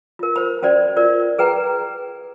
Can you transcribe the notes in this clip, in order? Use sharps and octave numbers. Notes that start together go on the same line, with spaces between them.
F4 A#4
C5 B5
C#4 F#4 C5 D5
F4 A#4 D5
G#4 B4 G5 A#5